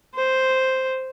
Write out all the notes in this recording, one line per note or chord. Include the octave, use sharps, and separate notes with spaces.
C5